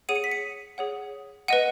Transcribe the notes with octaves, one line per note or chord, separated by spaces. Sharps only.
G#4 C#5 F#5 D#7
C#7
B6
C#7
G#4 C#5 F#5
B4 D#5 F#5 D#7